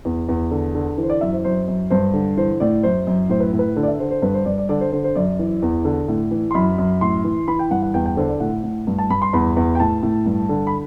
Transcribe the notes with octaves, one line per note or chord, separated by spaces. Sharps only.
E2
E2
D3
D3
E3
C5
D5
F#2 E5
C5
F#2 C5
F#2
G2 C5
D3
E3 C5
A2 D5
F#2 C5
F#2
A2 C5
B4
A2
B4
D3
D5
E5
D3 C5
C5
G2 B4
C5
G2 D5
D5
D3 D5
C5
D3 C5
C5
F#2 D5
E3
E2
D3
A2
E3
C6
F#2 B5
F#2
A2 C6
E3
E3 B5
G5
G2 F#5
F#5
E2 G5
G5
D3 C5
D5
A2 F#5
A2
G2
A5
G2 B5
C6
E2 B5
E2
G5
A2 A5
A2
G2
D3
B5